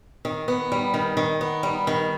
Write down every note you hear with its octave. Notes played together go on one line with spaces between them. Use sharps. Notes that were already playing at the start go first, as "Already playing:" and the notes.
D#3
B3
G3
D#3
D#3
B3
G3
D#3